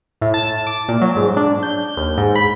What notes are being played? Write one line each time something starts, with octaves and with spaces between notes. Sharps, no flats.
A2
A5
D6
A#2
F#3
G#2
D4
G6
D#2
G#2
B5